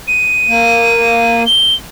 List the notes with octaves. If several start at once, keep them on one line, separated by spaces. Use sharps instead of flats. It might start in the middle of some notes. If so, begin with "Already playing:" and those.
D#7
A#3
G7